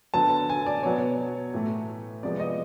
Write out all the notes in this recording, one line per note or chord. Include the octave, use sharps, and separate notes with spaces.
D3 F#3 B3 A5
G#5
D5
B2 F#3 B3 C#5
A2 E3 A3
C3 F3 G#3 B3 D5
D#5